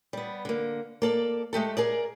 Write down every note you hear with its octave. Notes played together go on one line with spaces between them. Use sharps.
G3 B3
D3 A#3
A#3 A4 D5
G#3 A3 G4 A4
G#4 A#4 D5